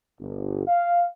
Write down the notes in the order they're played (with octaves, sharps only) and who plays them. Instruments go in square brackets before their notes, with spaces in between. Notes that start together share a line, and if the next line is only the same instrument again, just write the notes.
[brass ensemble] G1
F5